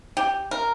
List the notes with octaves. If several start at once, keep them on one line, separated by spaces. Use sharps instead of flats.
G4
A#4